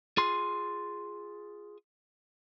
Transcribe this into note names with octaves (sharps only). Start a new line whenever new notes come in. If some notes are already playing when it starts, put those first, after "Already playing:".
F4 G#4 C6